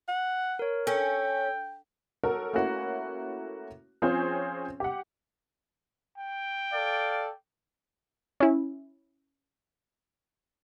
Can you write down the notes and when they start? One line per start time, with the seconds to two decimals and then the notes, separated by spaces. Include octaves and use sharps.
0.08 F#5
0.59 A#4 C#5
0.87 C#4 A4 G5
2.24 F#4 A4 A#4 C#5
2.53 A3 A#3 C#4 E4 F#4
4.02 F3 C4 C#4 G#4 C5
4.80 G4 F#5
6.18 G5
6.73 A4 D5 F5
8.40 C#4 E4